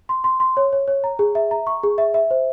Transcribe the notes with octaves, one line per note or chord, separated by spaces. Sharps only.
C6
C6
C6
C#5
C#5
C#5
A#5
G#4
E5
A#5
C#6
G#4
E5
E5
C5